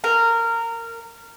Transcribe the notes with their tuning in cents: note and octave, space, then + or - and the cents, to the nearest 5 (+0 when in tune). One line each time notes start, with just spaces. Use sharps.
A#4 -20